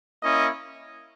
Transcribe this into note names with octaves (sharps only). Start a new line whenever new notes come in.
A#3 C#4 E4 D#5